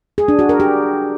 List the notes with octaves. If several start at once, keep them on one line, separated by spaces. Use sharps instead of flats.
G#4
D4
F#4
A#4
G4